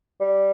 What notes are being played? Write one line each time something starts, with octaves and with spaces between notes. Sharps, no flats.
G3